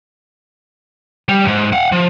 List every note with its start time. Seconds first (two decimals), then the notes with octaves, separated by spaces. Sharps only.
1.29 G3
1.44 D2 G#2
1.73 F5 F#5
1.92 F3